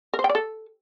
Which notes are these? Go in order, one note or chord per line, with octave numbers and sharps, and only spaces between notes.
A#4
C5
G5
D5
A4